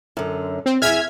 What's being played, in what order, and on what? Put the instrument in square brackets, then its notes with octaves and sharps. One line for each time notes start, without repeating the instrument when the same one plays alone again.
[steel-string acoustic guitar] F#2 D3
[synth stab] C4
[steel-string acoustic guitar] E2 G#4 E5 [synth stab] F6 G#6 B6